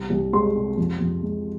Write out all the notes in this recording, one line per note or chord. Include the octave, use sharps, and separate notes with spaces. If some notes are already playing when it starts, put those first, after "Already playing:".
Already playing: C2
C2
G#3 C6
C3
F2
F2
G#3